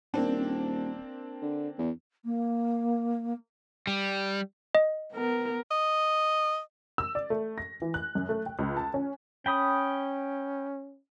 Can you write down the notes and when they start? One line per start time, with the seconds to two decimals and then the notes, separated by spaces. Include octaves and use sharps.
0.14 D#1 A#3 C4 D4
1.42 D3
1.78 E2
2.25 A#3
3.87 G3
4.75 D#5
5.13 B3 A#4
5.71 D#5
6.98 E6
7.15 D5
7.30 A3
7.58 A#6
7.82 E3
7.94 F#6
8.15 F#2
8.29 A3
8.46 G5
8.59 C#2
8.77 A5
8.94 C#4
9.46 C#4 G5 B5 D#6